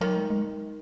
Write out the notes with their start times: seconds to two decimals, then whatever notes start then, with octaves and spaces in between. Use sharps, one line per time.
0.01 D#3 F#3
0.16 G#3
0.30 G#3